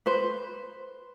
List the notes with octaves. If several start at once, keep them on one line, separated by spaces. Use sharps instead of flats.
B4 C5